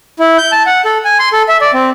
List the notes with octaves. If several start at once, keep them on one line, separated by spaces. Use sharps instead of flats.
E4
G6
A5
F#5
A4
G#5
C6
A4
E5
D5
C4